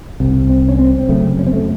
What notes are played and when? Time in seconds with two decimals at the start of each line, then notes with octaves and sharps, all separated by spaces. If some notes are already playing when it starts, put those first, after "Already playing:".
0.20 C2 C3
0.50 C4
0.69 C#4
0.79 C4
0.99 C4
1.09 F#1 F#2 C#3 A3
1.39 C#4
1.47 C4
1.53 A3